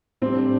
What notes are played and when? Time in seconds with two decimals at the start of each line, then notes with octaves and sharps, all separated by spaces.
0.22 A2 G3 C4 D4 G4